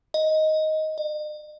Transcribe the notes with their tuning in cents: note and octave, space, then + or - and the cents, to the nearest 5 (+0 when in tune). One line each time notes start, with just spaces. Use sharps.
D#5 +10
D#5 -45